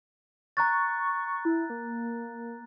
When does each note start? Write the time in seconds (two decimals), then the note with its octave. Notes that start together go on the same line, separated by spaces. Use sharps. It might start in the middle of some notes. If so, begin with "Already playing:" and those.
0.57 A#5 C#6 F#6 A6
1.45 E4
1.70 A#3